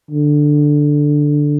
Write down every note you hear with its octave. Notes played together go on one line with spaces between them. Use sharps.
D3